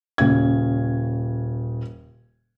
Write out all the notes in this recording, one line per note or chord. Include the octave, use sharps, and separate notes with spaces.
D#1 C#3 G#6